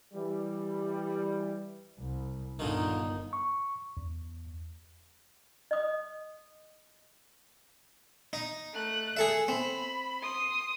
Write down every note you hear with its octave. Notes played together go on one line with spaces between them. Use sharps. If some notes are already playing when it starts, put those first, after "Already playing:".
E3 G3
C2
G1 A#2 D3 D#3 D#4
C#6
E2
D#5 D#6
D#4
A3 F#6
G#4 A4 E5
C4 B5
C6 D#6